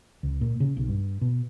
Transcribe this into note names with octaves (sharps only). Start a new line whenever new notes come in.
C#2
A#2
C#3
B1
G2
B2